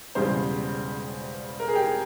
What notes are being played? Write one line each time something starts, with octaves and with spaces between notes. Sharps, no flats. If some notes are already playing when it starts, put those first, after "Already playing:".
E1 E2 C#3 G3 C5
A#4
G#4
G4
G#4